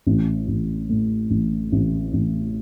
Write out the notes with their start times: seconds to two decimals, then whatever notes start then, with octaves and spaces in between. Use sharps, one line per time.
0.07 A1
0.48 A1
0.89 A2
1.31 A1
1.72 A1
2.13 A1